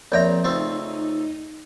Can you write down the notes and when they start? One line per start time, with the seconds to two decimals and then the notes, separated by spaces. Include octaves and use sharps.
0.12 A#1 C4 C#5 D5 E5 G5 A#5
0.44 C#2 A3 C4 D#4